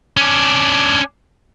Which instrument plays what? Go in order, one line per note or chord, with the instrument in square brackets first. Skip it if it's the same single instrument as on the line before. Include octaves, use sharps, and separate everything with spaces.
[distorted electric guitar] C#4 D4